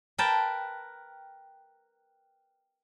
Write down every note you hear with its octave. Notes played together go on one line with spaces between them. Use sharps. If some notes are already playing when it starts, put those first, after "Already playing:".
A#4 B4 G5 A5